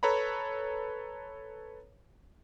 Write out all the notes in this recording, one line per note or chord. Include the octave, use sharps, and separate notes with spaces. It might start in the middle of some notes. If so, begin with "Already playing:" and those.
A4 B4 C#5 A#5 B5